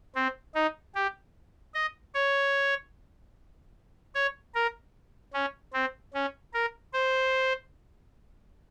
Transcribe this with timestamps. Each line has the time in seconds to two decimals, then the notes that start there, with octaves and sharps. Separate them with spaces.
0.15 C4
0.55 D#4
0.95 G4
1.74 D#5
2.14 C#5
4.15 C#5
4.55 A#4
5.34 C#4
5.73 C4
6.14 C#4
6.54 A#4
6.93 C5